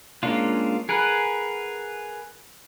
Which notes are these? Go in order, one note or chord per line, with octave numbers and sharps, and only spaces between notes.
G#3 A#3 C#4 D4 F4
G#4 A#4 B4 F#5